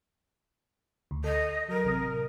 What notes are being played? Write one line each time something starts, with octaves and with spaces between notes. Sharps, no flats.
D2
A4 D#5
F#3 A#4
A1 C3 D#6